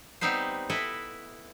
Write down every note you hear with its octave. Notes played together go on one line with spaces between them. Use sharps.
G3 B3 C4 D#4 B4 C5
E4 A4 B4 D#5 E5